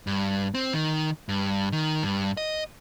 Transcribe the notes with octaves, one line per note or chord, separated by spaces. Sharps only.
G2
C4
D#3
G2
D#3
G2
D#5